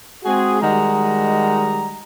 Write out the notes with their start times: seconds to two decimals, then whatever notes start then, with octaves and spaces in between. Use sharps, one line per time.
0.24 G#3 C4 F#4 G#4
0.61 D#3 G3 G#3 F#4 D#5 A#5